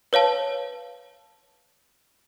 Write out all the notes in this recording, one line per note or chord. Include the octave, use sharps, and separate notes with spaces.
B4 C#5 F5 A5